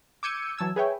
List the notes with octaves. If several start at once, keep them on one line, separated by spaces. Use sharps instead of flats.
D6 E6 G6 G#6 C#7 D#7
E3 F#3 A5 E6 G#6
G#4 B4 C#5 E5 G5 G#5